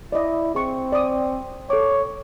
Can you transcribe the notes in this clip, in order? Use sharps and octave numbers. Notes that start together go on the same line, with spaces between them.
E4 D5 D#5
C4 G#4 C#6
D5 D#6
A4 C#5 D6